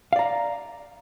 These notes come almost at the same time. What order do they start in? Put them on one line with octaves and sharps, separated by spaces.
F5 D5 A#5